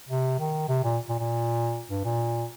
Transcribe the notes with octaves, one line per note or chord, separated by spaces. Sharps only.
C3
D#3
C3
A#2
A#2
A#2
G2
A#2